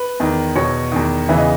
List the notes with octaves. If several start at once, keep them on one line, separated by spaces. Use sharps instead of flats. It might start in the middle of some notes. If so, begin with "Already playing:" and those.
Already playing: B4
E2 D#3
E2 B2 C#5
E2 D#3
E2 C#3 E3 E5
D#5